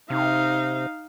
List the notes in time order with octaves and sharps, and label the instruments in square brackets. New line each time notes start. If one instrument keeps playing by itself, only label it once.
[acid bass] C3 [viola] D#4 F5